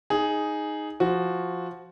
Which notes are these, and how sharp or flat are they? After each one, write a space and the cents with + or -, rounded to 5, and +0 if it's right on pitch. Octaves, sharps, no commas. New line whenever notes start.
D#4 +0 G#4 +5
F3 +0 F#4 +0